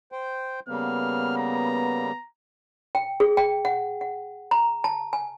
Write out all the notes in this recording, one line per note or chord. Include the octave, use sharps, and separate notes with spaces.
C5 G5
C#3 G3 A#3 B3 F6
A#5
G5
G#4
G5
F#5
F#5
A#5
A5
G#5